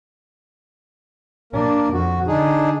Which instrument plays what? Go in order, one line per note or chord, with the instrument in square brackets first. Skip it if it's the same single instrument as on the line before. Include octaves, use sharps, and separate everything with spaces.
[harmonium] A#3 A#4 [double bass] D4
[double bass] F2 [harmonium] F#4
[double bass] D3 [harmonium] D4 D#4 G#4